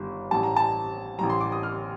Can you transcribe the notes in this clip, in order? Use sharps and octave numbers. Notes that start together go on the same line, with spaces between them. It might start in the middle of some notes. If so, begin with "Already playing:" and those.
Already playing: G1 G2 D#3 G3
A1 A2 G3 A5
A#5
A5
A1 A2 G3 A#5
C6
D6
D#6
F6